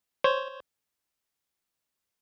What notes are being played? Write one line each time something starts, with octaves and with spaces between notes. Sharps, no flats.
C5 C#5